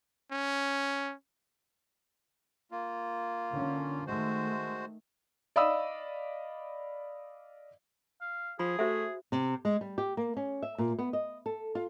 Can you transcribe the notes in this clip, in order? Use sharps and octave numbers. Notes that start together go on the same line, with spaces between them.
C#4
A#3 F4
D3 C#4
D#3 G#3 A3 F#4 C5
D5 D#5 F5 B5 D#6 E6
F5
F3 G#4 B5
A3 F#4 C5 E5
C3
G#3
G3
G4
A#3
C#4
E5
A#2
B3
D#5
A4
F4